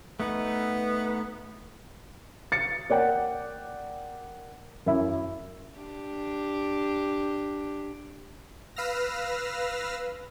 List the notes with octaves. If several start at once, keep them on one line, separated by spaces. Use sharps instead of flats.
A3 B3 D#4 B4
A6 C#7
A#3 D5 F#5 G5
F#2 E4
D4 G4
B4 F5 E6 F6 A#6